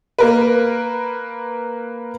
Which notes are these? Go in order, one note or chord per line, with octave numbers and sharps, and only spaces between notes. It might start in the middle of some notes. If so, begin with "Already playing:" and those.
A#3 A#4 B4